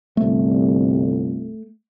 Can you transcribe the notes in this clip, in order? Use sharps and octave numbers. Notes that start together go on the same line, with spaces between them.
G1 C2 A3